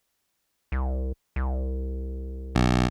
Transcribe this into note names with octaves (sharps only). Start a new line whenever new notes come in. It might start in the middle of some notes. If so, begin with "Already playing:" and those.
C2
C2
B1